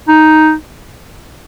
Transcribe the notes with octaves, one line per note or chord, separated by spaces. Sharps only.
D#4